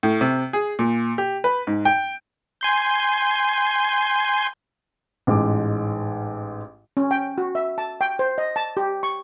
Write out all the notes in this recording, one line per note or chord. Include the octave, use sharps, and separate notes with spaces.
A2
C3
G#4
A#2
G4
B4
G#2
G5
G#5 C6 G6
A1 G#2 D6
C#4
G5
F#4
E5
A5
G5
C5
D#5
A5
G4
C#6